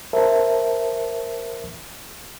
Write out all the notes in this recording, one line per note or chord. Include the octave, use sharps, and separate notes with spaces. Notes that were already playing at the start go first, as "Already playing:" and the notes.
A#4 C5 E5 A5